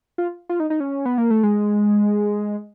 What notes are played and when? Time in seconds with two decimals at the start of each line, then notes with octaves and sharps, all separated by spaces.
0.18 F4
0.49 F4
0.60 D#4
0.70 D#4
0.80 C#4
1.05 B3
1.18 A#3
1.30 A3
1.43 G#3